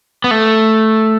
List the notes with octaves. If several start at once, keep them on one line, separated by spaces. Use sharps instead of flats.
B3
A3